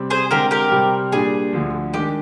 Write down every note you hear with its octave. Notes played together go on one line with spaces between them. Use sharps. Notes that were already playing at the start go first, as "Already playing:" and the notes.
Already playing: C3 G3 C4
G#4 C5
D3 G#3 C4 G4 A#4
G4 A#4
C3 G3 C4
A#2 G3 D4 G4 G#4
D2 D3 F3
D#3 G#3 D4 G4